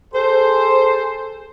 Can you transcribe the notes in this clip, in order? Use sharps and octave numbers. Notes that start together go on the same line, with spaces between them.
G#4 A4 C5